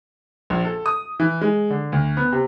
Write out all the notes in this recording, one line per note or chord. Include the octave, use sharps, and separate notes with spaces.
A#1
A4
D#6
E3
G#3
D3
D2
B3
C3